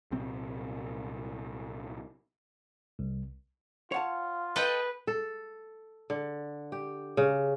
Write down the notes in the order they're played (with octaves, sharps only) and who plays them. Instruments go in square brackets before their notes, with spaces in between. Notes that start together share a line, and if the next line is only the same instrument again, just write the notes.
[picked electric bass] C2 A#2 F#3 C4
[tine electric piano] C2
[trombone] F4 [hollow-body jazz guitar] C#5 F#5 A5
[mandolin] A4 D#5 G5 [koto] B4
[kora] A4
D3
G4
C#3